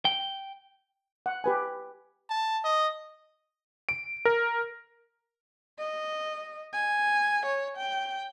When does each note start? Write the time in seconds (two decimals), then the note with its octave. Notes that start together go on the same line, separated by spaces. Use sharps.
0.05 G5
1.26 F#5
1.44 G4 B4 G#5
2.30 A5
2.65 D#5
3.89 D7
4.25 A#4
5.79 D#5
6.73 G#5
7.46 C#5
7.77 G5